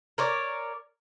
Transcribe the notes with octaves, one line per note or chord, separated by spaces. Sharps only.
A#4 C#5 D5